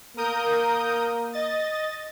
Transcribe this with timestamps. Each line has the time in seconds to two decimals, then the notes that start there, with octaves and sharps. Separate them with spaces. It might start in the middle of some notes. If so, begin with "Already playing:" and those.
0.17 A#3 A#4 D#6 G6
1.33 D#5 A6